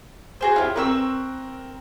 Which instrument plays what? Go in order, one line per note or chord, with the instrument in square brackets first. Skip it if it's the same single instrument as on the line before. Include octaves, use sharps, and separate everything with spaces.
[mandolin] F#4 G#4 C5
[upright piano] E4 G4 [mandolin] F4 C#5
[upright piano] C4 A#4 [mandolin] B4 C#6 E6